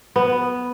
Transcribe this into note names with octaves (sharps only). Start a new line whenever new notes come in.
B3